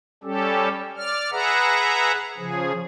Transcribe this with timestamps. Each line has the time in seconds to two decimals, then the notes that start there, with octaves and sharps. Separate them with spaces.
0.24 G3 C#4 G4 A4
0.97 D5 F6
1.32 G#4 B4 E5 F#5 A#5
2.38 C#3 F3 G#4